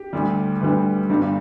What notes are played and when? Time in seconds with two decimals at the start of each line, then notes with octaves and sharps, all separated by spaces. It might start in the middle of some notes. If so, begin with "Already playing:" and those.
Already playing: G4
0.13 D2 D3 G3
0.61 D2 D3 G3 B4
1.10 G1 G2 G3